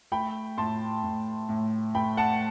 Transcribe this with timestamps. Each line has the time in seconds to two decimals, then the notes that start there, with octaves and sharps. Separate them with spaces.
0.12 A3 G5 B5
0.58 A2 A5 C6
1.03 A2
1.49 A2
1.95 A3 G5 B5
2.17 F#5 A5